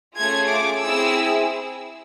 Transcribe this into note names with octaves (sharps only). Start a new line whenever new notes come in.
A3 C#4 F4 G#4 G#6
D6
C4 E4 G#4 E6